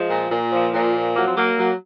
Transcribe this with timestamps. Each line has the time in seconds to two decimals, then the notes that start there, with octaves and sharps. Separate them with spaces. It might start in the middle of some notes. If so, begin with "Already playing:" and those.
Already playing: F3 G#3
0.10 A#2
0.31 A#2
0.52 F3
0.73 A#2
0.94 F3
1.15 F#3 A#3
1.26 C4
1.37 F#3 A#3
1.57 F#3